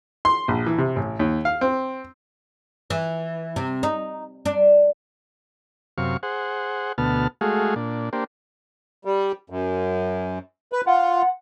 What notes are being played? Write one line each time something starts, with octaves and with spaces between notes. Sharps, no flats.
C6
A#1
E3
C3
A1
D#2
F5
C4
E3
C3
D#4
D4
F#2 C3 F5 C#6
G#4 C5 F#5
D2 B2 B3 A5 F6
G#3 A3 F#4 G#4 F5
A#2 D4
A#3 D4 G4 C5
G3
F#2
B4
F4 F#5